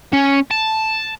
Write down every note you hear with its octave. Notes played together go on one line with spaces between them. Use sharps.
C#4
A5